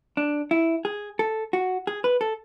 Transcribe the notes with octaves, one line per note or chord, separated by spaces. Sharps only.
D4
E4
G#4
A4
F#4
G#4
B4
A4